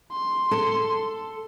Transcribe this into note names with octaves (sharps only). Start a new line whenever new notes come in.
C6
A4